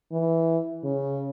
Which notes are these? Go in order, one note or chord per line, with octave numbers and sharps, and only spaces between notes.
E3
C#3